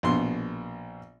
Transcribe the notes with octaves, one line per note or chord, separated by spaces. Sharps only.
A#1 B2 C6